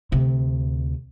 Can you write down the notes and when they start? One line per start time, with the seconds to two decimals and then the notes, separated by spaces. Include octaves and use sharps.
0.12 D2 C3